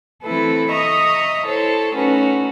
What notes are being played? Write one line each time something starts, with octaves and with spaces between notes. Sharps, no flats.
E3 A3 C4 E4 A4 B4
D#5 E5 A#5 C#6 D#6
E4 A4 C5 C#5
A3 C#4 D#4 F#4 A4 B4